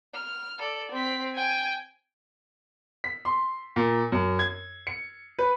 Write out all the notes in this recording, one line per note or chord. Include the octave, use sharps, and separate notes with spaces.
F6
A4 D5
C4 B6
G5 G#5
B6
C6
A#2
F#2
G#6
C#7
B4